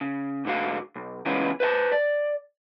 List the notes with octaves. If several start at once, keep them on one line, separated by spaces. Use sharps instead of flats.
C#3
G#2 D3 D#4 F#4 F5
B1
C#3 E3 G#3 B3 C#4 F4
B4 C5 E5 A5
D5